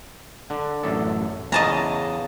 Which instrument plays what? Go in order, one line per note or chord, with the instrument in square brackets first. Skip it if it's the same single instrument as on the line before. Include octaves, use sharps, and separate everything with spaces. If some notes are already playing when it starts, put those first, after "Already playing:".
[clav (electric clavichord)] D3
A1 F#2 A4
[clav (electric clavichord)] E2 C#3 E3 [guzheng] D#5 A5 A#5